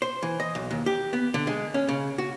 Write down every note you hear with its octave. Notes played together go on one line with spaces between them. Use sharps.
C5
E3
D#5
B1
D#2
G4
B3
D3
G#3
C#4
C#3
F#4